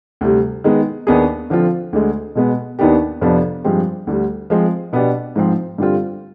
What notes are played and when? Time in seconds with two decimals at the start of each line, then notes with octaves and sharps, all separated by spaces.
0.21 D2 C3 G3
0.64 D#3 G#3 B3
1.07 D#2 D#3 B3 D4 G#4
1.50 D3 F3 C4 F4
1.93 D2 D3 G#3
2.35 B2 G#3 B3
2.79 D#2 D#3 B3 D4 G4
3.21 F2 C3 F3 B3 D4
3.64 G2 F3 G#3 C4 G4
4.07 D2 D3 G3
4.50 F3 G#3 C4
4.93 B2 B3 D4 G4
5.36 G#2 F3 C4
5.78 G2 D3 G3 C4 F4